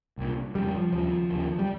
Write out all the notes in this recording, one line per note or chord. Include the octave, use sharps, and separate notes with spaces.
C2 A#2
F2 C#3 G3
F3
D#2 C#3 F3
D#2 C#3
G3